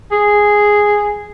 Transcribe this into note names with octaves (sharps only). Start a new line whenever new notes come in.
G#4